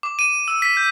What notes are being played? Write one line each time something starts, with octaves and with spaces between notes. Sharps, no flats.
D6
D#7
E6
B6
G6